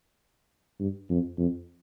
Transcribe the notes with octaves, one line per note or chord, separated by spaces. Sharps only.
G2
F2
F2